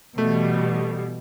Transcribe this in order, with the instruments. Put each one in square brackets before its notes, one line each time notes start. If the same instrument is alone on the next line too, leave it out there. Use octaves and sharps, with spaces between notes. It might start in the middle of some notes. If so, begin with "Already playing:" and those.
[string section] B2 E3 G3 [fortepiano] A3